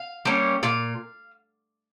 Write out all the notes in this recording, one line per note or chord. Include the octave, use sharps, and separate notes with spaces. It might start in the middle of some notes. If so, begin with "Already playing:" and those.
Already playing: F5
G3 A#3 C#4
A#2 F5